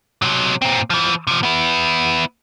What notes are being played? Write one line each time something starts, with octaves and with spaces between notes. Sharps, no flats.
C3 F#3
A#2 C4
E3 F3
C3 F3
B3 E4